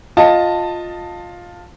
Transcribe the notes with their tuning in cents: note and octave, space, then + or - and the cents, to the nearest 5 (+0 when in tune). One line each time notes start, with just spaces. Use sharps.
F4 +10 D#5 +0 A5 +15